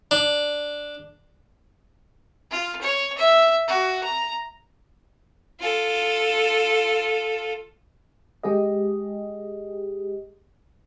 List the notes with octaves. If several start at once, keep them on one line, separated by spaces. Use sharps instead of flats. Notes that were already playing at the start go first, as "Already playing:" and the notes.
D4
F4
C#5
E5
F#4
A#5
F4 A4
G#3 G4 G#4 D#5